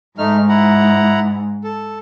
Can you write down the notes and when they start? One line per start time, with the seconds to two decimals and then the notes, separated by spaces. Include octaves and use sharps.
0.18 G#2 A3 D#4 F6
0.49 E4 F#5 A#5
1.64 A4